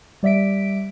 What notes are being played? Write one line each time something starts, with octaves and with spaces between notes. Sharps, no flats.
G3 D5 E5 B6 D7